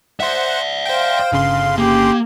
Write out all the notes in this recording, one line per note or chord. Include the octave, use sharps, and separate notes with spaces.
C5 D5 E5 F#5
C5 F5 G5
G1 C#3 C6
A#3 G4